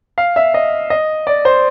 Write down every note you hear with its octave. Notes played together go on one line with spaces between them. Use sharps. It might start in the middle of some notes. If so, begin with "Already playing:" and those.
F5
E5
D#5
D#5
D5
C5